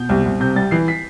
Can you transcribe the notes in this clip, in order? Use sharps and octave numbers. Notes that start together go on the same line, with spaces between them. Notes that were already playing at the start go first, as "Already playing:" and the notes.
Already playing: B2 G6
C2
C2
C3 G6
G3 A6
E3 C7
B6